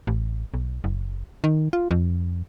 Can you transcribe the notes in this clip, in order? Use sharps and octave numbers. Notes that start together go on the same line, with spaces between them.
A1
B1
F#1
D#3
F4
F2